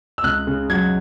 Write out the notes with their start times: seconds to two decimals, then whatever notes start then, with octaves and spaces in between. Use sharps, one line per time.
0.18 E6
0.23 C#2 F#6
0.47 C#3
0.70 F#3 G#6